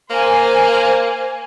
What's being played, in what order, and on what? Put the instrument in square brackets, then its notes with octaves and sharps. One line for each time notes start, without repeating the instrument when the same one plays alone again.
[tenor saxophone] A#3 [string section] C5 G#5